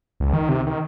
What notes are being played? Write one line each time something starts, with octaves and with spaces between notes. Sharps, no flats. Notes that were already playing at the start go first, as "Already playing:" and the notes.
C#2
D#3
C3
D#3